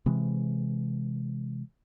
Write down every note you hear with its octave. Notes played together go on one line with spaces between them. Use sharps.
C3 E3 G#3